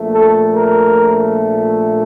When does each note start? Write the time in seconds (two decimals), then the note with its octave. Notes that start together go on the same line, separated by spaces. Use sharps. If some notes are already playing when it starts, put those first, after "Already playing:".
Already playing: A#1 A#2 A3
0.14 A4
0.54 A#4